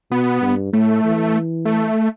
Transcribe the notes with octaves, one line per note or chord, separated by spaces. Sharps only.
B2 B3
G2
A2 A3
E3
A3